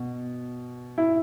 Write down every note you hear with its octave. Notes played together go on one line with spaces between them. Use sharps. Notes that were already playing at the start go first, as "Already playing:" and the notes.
Already playing: B2
E4